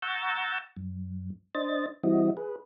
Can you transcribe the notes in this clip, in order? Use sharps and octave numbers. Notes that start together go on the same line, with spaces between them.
F#5 A#5 C#6 E6 G6 A6
F#2
D4 C5 D#5 A6
E3 G3 C4 E4 F#4 D#5
G#4 B4